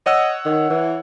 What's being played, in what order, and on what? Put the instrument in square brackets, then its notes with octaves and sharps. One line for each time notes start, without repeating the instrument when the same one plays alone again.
[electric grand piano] C#5 F#5 E6 [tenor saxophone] D#5
[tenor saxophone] D#3
E3